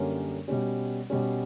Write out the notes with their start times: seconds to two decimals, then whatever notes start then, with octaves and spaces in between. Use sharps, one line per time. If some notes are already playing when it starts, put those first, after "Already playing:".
Already playing: F#2 D3 G3 A#3 C#4
0.48 B2 G3 C#4
1.10 B2 G3 C#4